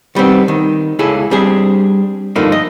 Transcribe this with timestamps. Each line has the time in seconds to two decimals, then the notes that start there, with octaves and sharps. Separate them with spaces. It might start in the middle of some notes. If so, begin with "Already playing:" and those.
0.15 D#3 G3 B3 C4
0.48 D#3
0.99 C#2 E4 G#4 A4
1.31 G3 C4 D4 G#4
2.36 G2 D3 F3 A3 A#3 D#4
2.52 D#5